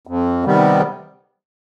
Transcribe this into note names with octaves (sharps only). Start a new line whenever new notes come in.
F2
C3 D#3 G3 B3